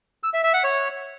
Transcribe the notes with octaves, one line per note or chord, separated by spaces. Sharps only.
E6
E5
E5
F#5
C#5